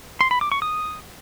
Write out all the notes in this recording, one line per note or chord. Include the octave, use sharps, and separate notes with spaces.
C6
B5
D6
C#6
D#6